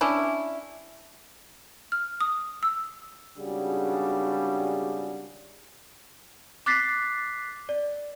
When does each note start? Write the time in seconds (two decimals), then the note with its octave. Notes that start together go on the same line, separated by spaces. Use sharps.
0.01 C#4 D4 E4
1.92 F6
2.21 D#6
2.63 E6
3.38 G#1 C#3 G3 D4 F#4 G#4
6.66 D6 F#6 A6 B6 C7
7.69 D5